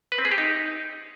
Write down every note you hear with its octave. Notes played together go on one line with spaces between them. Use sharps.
B4
C4
G#4
G4
D#4